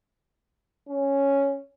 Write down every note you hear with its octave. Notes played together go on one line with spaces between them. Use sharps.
C#4